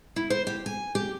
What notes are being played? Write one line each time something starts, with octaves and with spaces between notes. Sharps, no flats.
E4
C5
G4
G#5
G4